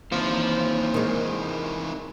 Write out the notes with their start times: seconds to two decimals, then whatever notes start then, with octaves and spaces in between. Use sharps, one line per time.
0.12 D#2 C3 E3 C5 F5
0.94 D#3 G#3